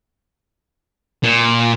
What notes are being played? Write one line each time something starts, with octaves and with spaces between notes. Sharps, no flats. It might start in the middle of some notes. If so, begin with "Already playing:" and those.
A#2